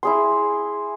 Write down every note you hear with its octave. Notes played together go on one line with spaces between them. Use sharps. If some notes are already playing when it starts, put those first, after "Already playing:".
E4 G#4 C6